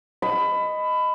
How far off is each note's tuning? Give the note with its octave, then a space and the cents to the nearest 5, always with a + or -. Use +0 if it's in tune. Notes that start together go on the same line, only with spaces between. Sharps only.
D#5 +0 B5 +20